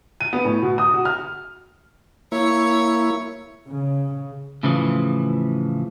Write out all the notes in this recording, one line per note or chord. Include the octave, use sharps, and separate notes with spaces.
D#7
B3
A2
B2
D#6
F#4
F6
A#3 E4 C#5
C#3
A2 C#3 E3 F3